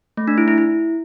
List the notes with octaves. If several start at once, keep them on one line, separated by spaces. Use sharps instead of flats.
A3
D4
E4
E4
E4